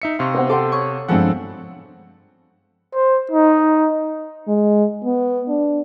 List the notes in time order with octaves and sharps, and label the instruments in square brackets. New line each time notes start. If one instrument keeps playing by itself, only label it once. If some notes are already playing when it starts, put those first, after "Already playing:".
[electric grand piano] D#4 E5 C#7
[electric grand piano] C3 F5 [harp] C6 C#6 A#6
[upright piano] B3 C5 F#5
[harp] G4 C6 D6 [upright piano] A4 F#5
[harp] C#5 C#6 D#6
[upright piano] G2 G#3 [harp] F3 B3 [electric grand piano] C4 A4 F#5
[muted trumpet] C5
D#4
[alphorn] G#3
B3
D4